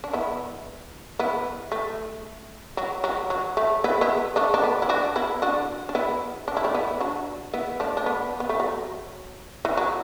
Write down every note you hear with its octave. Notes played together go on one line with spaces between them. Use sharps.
D4
B3 E4
B3 E4
A3
F#3
F#3
F#3
A3
B3 E4
B3 E4
A3 D4
D4
B3
E4
D4 F#4
B3 E4
D4 F#4
D4
B3 E4
D4
E4
A3 D4
B3 E4
D4 F#4
B3 E4
A3 D4
D4
B3
B3
A3
F#3
E3
F#3